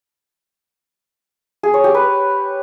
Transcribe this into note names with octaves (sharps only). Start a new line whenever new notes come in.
G#4
C#5
G4
B4